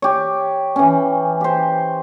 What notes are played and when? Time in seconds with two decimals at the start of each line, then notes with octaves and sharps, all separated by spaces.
0.02 G4 C#5
0.76 E3 C#4
1.41 G4 C5